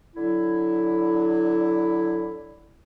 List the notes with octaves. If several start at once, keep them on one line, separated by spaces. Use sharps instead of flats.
D3 F#3 E4